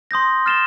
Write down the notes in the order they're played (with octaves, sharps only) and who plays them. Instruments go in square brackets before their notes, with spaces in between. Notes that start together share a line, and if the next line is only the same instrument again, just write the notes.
[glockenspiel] C6 D#6 G6 A#6
F6 A6 C7 E7 G7